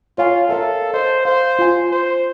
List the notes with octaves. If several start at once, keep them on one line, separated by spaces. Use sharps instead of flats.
F4 C#5 F5 G#5
A4 A#4 E5 F5
C5 D#5
C5 F5
F4 G#5
C5